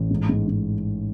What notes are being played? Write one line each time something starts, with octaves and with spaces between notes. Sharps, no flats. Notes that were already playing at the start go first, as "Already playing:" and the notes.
Already playing: A1
G#2
G#2
G#2